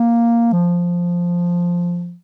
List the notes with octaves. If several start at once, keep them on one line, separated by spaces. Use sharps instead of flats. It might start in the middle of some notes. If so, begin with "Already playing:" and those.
Already playing: A#3
F3